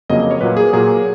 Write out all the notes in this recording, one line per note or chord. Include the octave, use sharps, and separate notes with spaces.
F2 C#3 F#3 A#3 D#5
D#5
C#5
A#2 F#3 A#3 B4
G#4
A#2 F#3 A#3 G#4